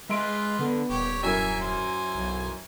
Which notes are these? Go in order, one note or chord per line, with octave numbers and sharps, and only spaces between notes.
G#3 F4 B4 E5 C6 D7
D3 B3
D#1 G4 C#5
F#2 E4 A#4 E5 G#5
C5 G#5
B1